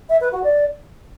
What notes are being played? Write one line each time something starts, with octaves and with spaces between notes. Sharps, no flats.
E5
B4
F#4
D5